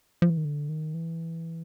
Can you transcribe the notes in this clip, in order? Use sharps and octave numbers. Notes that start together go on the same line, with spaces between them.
F3
E3
D#3
D3
D#3
E3